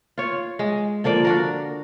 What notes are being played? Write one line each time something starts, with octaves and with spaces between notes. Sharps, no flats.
F4 C#5
G#3
D3 F3 A#3 D5
D4 F#4 A#4